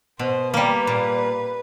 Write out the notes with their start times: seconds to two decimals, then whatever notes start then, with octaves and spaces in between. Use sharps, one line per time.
0.19 B2 C5
0.53 G3 A#3 B4
0.87 A#2